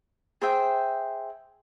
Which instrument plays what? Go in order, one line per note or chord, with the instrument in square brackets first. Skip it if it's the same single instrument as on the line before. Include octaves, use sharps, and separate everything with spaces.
[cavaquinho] G#4 C5 E5 G5